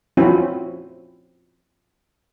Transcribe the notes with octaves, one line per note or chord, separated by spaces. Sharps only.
F3 C4 C#4 E4 F#4